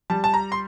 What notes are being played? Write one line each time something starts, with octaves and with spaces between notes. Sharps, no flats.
G3 A5
A5
A#5
C6